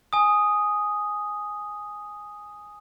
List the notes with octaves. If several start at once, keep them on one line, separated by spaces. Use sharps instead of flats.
G#5 D#6